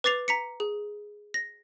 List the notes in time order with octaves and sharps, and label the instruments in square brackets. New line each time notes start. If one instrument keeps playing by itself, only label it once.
[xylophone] B4 D6 A6 C7 F7
A#5 B6 C#7
G#4
A#6